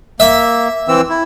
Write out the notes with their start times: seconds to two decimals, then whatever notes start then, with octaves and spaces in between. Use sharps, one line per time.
0.20 A#3 E5
0.88 E3 C4 E6
1.10 E4